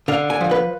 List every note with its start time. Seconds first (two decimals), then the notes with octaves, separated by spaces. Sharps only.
0.08 D3 F5
0.30 G#5
0.41 F3
0.51 B4